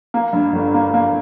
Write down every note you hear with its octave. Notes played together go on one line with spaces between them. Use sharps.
A#3
G2
G1
A#3
A#3